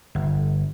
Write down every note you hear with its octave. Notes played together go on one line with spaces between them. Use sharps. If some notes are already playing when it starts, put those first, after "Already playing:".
G1